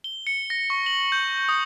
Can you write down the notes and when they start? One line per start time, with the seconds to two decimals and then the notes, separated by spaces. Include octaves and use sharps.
0.04 G7
0.27 C#7
0.50 A#6
0.70 C#6
0.86 F#7
1.12 G6
1.49 D#6